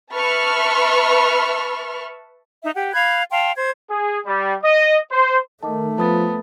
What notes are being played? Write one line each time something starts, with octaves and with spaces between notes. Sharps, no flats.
B4 E5 A5 B5 C#6 F6
D#4 E5
G4 F#5
F5 B5 F#6 G#6
F5 G5 A5 C6
C5 G#6
G#4
G3
D#5
C5
D#3 A3 A5 D6
F3 B3 A5 D#6 A6